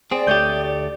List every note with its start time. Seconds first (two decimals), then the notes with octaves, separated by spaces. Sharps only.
0.11 C4 G#4 D5 D7
0.27 D2 A3 G4 C#5 D#6 G6